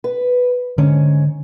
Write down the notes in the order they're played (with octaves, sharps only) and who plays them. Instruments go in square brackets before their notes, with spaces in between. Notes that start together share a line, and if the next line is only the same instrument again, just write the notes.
[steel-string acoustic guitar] B4
[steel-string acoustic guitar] G#2 C#4 [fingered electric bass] D3